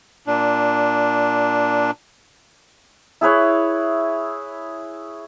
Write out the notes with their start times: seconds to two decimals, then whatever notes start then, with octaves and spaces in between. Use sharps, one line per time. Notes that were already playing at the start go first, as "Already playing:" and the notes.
0.27 A#2 D4
3.21 E4 G#4 B4 C#5